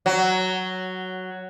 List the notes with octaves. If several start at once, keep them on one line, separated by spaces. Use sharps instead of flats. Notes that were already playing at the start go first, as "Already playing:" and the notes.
F#3